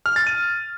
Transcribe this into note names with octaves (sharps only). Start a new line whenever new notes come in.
F6
A6
D#7